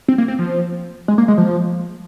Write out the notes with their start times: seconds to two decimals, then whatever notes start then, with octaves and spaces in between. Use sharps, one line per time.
0.08 C4
0.18 A#3
0.28 C4
0.39 F3
1.08 G#3
1.18 A#3
1.28 G#3
1.38 F3